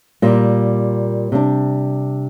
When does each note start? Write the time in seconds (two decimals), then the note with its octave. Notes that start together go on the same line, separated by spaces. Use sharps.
0.22 A#2 G3 A#3
1.32 C3 G3 D4